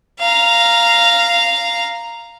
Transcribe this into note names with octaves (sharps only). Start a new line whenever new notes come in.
F5 A#5